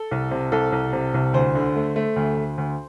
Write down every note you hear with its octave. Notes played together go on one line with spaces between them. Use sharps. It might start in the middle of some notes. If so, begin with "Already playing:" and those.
Already playing: A4
C2
C3
C2 A4
C2
C3
C2
D2 C5
D3
A3
A3
D2
D2
D2